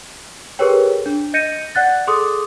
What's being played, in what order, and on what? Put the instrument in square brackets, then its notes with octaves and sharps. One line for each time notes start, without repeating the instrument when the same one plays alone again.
[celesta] G4 G#4 A#4 B4 C#5 G5
D4
D#5 G6 A#6 C#7 D#7
D5 F#5 F#6 A6
G#4 A4 C6 D6 D#6